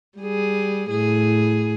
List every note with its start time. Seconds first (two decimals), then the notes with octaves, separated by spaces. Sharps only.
0.18 G3 G#4
0.91 A2 G#4